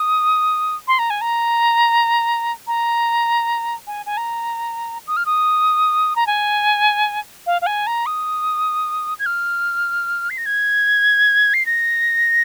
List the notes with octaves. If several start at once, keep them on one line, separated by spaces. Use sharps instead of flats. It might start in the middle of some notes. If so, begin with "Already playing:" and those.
Already playing: D#6
C6
A#5
G#5
A#5
A#5
G#5
G#5
A#5
D#6
F6
D#6
A#5
G#5
F5
F5
G#5
A#5
D#6
G#6
F6
C7
A#6
G#6
C7
A#6